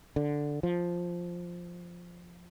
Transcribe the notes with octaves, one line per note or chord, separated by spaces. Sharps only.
D3
F3